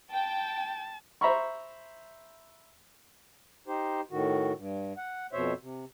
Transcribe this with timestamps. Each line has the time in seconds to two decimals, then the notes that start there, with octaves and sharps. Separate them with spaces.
0.12 G5 A5
1.21 C5 E5 A#5 B5 C#6
3.68 D#4 G4 C5
4.11 A2 D#3 F#4
4.57 G2
4.97 F#5
5.33 F2 B2 C5 C#5 E5
5.61 C3